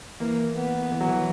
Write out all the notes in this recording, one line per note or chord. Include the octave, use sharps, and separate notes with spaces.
E3 A#3
B3
E3
F#3
E3